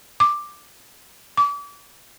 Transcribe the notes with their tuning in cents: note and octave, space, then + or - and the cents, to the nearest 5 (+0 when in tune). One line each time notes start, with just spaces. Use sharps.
D6 +10
D6 -35